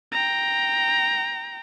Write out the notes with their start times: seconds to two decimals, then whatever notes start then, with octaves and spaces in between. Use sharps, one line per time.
0.12 G5 A#5